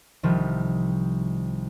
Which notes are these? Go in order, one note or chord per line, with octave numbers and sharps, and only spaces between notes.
C2 C3 D#3 F3